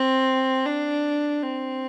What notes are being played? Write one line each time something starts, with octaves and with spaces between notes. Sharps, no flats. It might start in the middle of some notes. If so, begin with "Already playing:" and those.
Already playing: C4
D4
C4